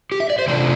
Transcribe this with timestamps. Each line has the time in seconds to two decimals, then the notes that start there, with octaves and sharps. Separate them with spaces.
0.12 G4
0.20 E5
0.30 D5
0.39 C5
0.48 C3 F3 A3 D4 D5